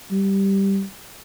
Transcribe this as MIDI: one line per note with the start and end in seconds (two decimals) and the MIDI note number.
0.11 0.83 55